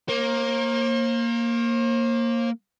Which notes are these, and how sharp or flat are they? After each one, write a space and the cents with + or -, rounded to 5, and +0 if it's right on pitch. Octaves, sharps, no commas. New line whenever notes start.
A#3 +0 C5 +45